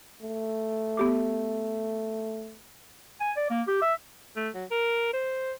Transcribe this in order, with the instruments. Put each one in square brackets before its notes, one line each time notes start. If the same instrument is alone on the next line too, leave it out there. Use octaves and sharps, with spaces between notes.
[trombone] A3
[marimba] B3 G4 D6
[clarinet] G#5
D5
A#3
G4
E5
[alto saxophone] A3
F#3
A#4
C5